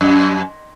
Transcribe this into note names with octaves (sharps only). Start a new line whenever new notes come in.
F#2